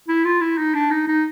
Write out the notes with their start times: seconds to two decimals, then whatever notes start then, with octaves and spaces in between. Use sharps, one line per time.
0.08 E4
0.25 F4
0.41 E4
0.58 D#4
0.75 D4
0.91 D#4
1.08 D#4